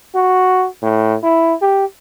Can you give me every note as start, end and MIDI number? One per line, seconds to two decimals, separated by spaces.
0.15 0.67 66
0.82 1.16 45
1.23 1.54 64
1.62 1.85 67